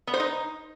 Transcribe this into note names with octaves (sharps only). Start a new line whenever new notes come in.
B3
C5
D#4